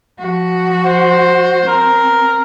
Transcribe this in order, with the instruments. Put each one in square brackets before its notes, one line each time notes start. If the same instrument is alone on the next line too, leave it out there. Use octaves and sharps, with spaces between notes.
[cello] F3 F#4
[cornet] C5
[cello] C4 [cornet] A#4